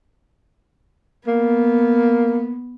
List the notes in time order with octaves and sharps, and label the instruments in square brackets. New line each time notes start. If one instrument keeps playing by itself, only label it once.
[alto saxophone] A#3 [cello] B3